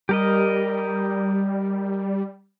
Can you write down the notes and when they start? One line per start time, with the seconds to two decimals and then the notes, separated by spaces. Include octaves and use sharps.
0.09 G3 G4 A#4 D#5